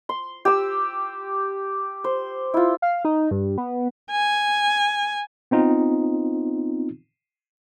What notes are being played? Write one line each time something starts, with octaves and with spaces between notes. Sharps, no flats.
C6
G4 E6
C5
E4 F4
F5
D#4
G2
B3
G#5
B3 C4 D#4 F4